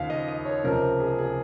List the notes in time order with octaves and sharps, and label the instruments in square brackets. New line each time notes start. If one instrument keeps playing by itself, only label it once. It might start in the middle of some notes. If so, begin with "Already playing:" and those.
Already playing: [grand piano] D#2 C#3 F3 F5
D#5
D#5
C#5
C#2 C3 F3 A#4
G#4
G#4